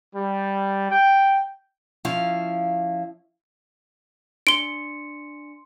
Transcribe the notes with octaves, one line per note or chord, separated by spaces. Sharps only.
G3
G5
F3 C#4 E4 F5
D4 C6 C#7 D7 G7